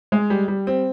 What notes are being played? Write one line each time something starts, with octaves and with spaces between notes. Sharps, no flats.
G#3
G3
G3
C4